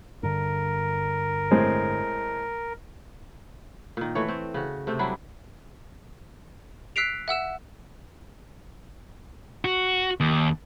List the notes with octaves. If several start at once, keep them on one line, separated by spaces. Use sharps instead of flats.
G2 D3 A#4
A2 G#3 C4
A#2 D#3
E3 A3 C#5
C4
C#3 F#4
C3 A3 C4
F#3 G3 D4 E4
E6 F#6 B6 C7 D7 F7
E5 F#5 E6 E7
F#4
D#2